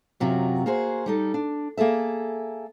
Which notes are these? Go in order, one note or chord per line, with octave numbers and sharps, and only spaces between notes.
F#2 C3 F#3 F4 F#4
A#3 F#4 G#4 C5
G3 D#4 A4
D4
A#3 G#4 A4 E5